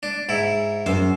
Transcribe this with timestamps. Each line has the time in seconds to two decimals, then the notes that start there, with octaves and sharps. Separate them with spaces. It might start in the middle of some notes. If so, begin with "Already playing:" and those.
0.03 D4
0.29 G#2 E4
0.86 F#2 C5